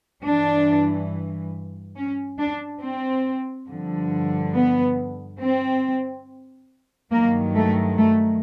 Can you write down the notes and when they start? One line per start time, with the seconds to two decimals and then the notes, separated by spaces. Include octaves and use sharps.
0.23 G2 E3 D4
1.96 C#4
2.38 D4
2.81 C4
3.68 G2 D3 F3
4.54 B3
5.40 C4
7.12 G2 D#3 F#3 A#3
7.55 A3
7.98 A3